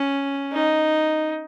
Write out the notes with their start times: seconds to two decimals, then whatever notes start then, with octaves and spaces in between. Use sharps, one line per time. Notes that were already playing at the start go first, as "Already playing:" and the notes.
Already playing: C#4
0.53 D#4